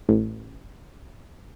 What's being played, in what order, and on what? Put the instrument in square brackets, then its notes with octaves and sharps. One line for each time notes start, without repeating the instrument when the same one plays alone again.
[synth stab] A1